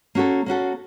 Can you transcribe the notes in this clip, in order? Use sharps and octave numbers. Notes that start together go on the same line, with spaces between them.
A#3 C#4 F#4 A4
A#3 C#4 F#4 A4